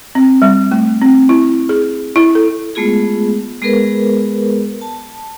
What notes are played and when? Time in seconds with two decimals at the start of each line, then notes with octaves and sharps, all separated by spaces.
0.15 C4
0.42 G3
0.71 A3
1.02 C4
1.29 E4
1.69 G#4
2.16 E4
2.35 A4
2.75 G#3 A3 B3 F4 G#4
3.62 G#3 B3 G#4 A#4 B4
4.81 A5